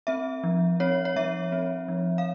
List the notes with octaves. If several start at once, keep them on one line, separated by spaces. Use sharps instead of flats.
C4 E5
F3
C4 C#5
C#5
F3 E5
C4
F3
F5